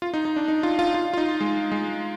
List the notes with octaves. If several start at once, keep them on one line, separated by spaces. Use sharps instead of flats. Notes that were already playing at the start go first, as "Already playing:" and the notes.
F4
D#4
D#4
D4
D#4
F4
F4
F4
F4
D#4
G#3
G#3